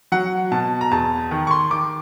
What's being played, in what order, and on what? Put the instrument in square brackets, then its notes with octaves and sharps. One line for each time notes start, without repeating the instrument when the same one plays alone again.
[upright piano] F#3 F#5
B2 A5
A#5
E2 A5
D#3
C#6
C6
D#3 D6